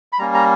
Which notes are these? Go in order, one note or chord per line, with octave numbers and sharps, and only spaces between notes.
B5
G3 A#3 C#4 A#5
A#5